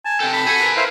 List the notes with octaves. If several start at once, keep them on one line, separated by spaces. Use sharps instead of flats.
G#5 A5
C3 A4 G5
B5
F#4 A4 G#5
A#4 B4
E4 C5 F5